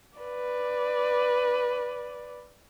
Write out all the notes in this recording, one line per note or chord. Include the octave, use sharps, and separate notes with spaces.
B4 D5